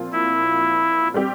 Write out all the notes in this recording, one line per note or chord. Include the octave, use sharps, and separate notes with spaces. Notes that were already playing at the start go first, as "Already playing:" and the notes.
Already playing: A#2 F3 C4 F4
E4
G3 C4 G4